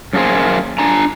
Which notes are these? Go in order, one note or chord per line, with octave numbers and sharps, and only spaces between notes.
F#2 A3 A#3 G#4 C5
D4 G#5 A#5